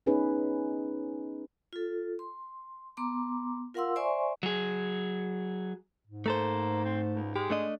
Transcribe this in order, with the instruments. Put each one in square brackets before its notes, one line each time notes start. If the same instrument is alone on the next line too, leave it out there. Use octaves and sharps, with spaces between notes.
[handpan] B3 C#4 D#4 G#4 B4
[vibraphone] F4 A4
C6
B3 A#5 C6 D6
F4 A#4 F5 F#5 C6 E6
C5 D5 E5 G#5 C6 C#6
[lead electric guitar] F#3 G#4
[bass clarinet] G#2
[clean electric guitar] A3 A4 C5 [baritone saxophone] A#3
[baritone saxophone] C4
C#2
[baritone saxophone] G#3 [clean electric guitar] G4
[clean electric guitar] A3 D4 D#5